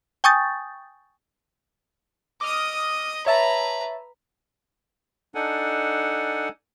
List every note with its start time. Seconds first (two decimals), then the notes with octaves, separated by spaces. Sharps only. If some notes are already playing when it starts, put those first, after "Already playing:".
0.24 G5 G#5 C#6 D#6 G6 A6
2.41 D#5 D6 D#6 F6
3.26 B4 C#5 E5 A5 A#5
5.35 D4 D#4 A4 F#5 G#5